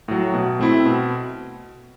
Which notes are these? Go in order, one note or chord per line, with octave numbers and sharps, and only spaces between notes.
A2 F#3
B2
A3 C4 E4
B2